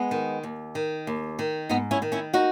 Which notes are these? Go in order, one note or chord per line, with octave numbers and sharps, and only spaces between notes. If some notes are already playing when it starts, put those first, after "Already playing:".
Already playing: G#3 B3
D#3
D#2
D#3
D#2
D#3
G#2 B3 D#4
C#4 E4
D#3
C#4 E4
D#4 F#4